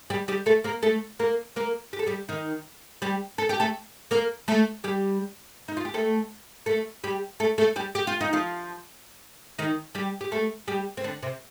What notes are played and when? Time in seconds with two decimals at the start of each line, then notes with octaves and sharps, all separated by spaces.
0.10 G3 G4
0.28 G3 G4
0.46 A3 A4
0.64 A#3 A#4
0.83 A3 A4
1.19 A#3 A#4
1.56 A#3 A#4
1.93 G4
1.99 A4
2.06 G3 G4
2.29 D#3 D#4
3.02 G3 G4
3.38 A4
3.49 G4
3.60 A3 A4
4.11 A#3 A#4
4.48 A3 A4
4.84 G3 G4
5.68 D#4
5.77 F4
5.85 G4
5.94 A3 A4
6.66 A3 A4
7.04 G3 G4
7.40 A3 A4
7.58 A3 A4
7.76 G3 G4
7.95 G4
8.07 F4
8.21 D#4
8.33 F3 F4
9.59 D#3 D#4
9.95 G3 G4
10.21 G4
10.32 A3 A4
10.68 G3 G4
10.97 C4
11.04 D3 D4
11.23 C3 C4